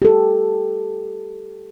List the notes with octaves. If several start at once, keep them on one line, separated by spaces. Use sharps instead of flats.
G4 A4